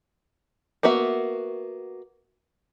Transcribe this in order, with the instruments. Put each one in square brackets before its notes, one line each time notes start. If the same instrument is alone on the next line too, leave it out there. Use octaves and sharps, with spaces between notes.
[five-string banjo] A#3 B3 F#4 E5